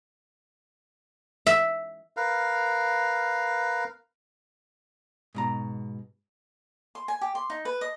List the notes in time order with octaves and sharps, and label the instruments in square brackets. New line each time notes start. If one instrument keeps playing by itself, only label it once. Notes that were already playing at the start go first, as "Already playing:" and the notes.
[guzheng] E5
[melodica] A#4 B4 F5
[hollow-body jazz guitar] G#2 B2 A#5
[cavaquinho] C6
G#5
G4
C6
D#4
B4
D#5